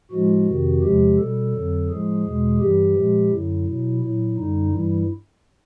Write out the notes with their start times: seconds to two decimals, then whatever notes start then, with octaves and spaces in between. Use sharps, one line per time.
0.11 A2 F3 G#3 F#4
0.47 F2 C3 D#3
0.82 E2 C3 F3 G#3 G4
1.18 B2 G3 A4
1.52 F2 D3 F#3
1.88 A2 F3 G#3 G#4
2.24 E2 B2 G#3
2.59 G2 E3 G3 G4
2.95 A#2 F3 G#3
3.30 F#2 D3 F#3 E4
3.66 B2 F#3
4.00 A#2 F#3 E4
4.36 F#2 D3 G3 D#4
4.71 G2 E3 G3 E4